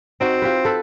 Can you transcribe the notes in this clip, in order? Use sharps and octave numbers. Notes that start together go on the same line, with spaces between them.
C4 D#4 F#4
F4 G4 B4
A4 B4